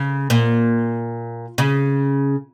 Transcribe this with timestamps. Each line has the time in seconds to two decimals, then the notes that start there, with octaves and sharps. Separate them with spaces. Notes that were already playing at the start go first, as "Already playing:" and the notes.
Already playing: C#3
0.30 A#2
1.58 C#3